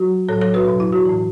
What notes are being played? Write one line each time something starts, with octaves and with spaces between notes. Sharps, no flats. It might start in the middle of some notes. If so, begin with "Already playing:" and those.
Already playing: F#3 F#4
A2 F#3 A4 C#5
A4 C#5
F#4 B4
E2 B2 F#3
E4
F#4
A2 E3